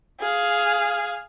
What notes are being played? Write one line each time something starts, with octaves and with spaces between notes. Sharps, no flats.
G#4 F5